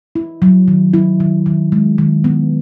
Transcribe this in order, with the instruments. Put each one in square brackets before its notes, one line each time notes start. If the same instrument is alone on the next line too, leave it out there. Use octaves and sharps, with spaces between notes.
[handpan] E4
F#3
D#3
E4
D#3
D#3
G#3
D#3
B3